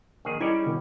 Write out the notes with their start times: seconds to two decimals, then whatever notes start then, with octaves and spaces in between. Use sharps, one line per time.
0.25 A#1 D#3 G#4
0.41 G3 C#4 D#4 E4 G#4 D5
0.66 B2 D3 D#3